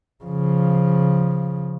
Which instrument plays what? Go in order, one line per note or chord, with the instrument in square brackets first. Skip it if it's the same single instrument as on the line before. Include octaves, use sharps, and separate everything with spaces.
[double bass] C#3 F3